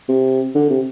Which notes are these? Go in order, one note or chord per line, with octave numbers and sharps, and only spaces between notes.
C3
D3
C3